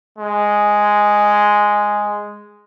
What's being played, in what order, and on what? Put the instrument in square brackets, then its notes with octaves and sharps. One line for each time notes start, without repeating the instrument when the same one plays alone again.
[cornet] G#3